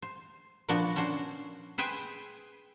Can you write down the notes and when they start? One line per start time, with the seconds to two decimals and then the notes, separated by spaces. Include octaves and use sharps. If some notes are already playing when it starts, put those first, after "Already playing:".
0.02 C5
0.68 A#2 F3 B3 D4 F#4
0.96 C#4 D4 F#4 C5
1.78 G#4 B4 C5 G5 G#5